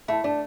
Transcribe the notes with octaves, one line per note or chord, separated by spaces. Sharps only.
A3 E4
A3 D4